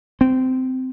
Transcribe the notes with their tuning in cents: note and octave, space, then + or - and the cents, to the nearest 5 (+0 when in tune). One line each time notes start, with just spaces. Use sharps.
C4 -20